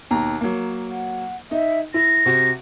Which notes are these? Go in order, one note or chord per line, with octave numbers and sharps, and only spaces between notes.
D#2 B2 A#5
F#3 A#3
F#5
D#4 E5
E4 A#6
C3 F#4